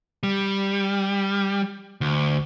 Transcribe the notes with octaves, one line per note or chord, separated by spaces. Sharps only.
G3
D2